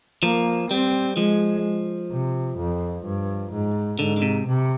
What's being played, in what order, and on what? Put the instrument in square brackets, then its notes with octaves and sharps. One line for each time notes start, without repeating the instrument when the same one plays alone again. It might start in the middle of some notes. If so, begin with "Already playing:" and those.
[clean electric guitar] F3 [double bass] A#3
[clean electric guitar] G3 [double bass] C4
[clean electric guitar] F3 [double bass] G#3
[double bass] C3
F2
G2
G#2
[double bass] G#2 [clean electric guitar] D3
[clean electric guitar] D3
C3
[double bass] C3